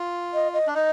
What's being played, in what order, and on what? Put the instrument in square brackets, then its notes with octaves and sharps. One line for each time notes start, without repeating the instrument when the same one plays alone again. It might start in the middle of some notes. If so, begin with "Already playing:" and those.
Already playing: [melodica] F4
[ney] D#5
D#5
[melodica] D4
[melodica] D#4 [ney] D#5